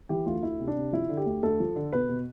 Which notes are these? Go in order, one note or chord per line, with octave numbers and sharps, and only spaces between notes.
E3 G4
D2 F4
D2 E4
C3
D4
C3
F3 E4
D3
G4
D2
D2 A4
F3
D3
B2 B4
B2